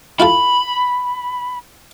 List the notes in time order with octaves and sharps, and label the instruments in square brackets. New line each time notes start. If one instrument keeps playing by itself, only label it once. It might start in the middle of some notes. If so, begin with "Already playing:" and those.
[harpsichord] E4 F4 A4 [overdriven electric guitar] B5